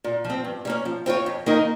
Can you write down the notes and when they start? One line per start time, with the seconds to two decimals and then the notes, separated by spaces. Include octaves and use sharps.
0.04 A#2
0.25 F3
0.30 C4
0.44 G2
0.65 G3 A#3 C#4
0.85 F3
1.06 C4 F4 A#4 C#5
1.26 F2
1.46 D#3 A#3 D#4 A#4